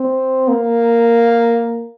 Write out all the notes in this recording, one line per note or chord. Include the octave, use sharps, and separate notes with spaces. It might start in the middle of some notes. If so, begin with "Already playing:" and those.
Already playing: C4
A#3